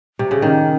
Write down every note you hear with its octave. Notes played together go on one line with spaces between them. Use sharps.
C3
C#3
D#3 C#4